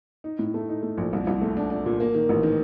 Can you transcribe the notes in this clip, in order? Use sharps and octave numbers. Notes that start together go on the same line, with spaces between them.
D#4
A2
A3
D#4
A3
A#1
C2
C2
A3
D4
D4
A#2
A#3
D#3
A1
D#3